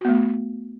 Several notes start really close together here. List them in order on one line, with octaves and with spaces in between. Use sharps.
F#4 B3 A3